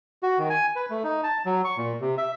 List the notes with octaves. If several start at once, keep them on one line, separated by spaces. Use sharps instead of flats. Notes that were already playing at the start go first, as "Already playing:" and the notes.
F#4
D#3
G#5
B4
A3
D#4
A5
F#3
C#6
A#2
C3
E5